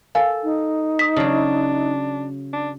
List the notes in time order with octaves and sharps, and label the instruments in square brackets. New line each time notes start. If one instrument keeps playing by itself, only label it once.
[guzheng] A4 [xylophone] A#4 F5 G#5
[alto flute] D#4
[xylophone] D#6 B6
[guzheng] C#3 F#3 [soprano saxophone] D4
[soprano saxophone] D4